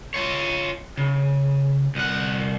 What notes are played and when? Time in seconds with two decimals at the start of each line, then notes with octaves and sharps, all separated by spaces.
0.14 F4 C#5
0.97 C#3
1.95 C2 F#5